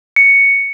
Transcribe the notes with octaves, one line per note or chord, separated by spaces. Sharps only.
C#7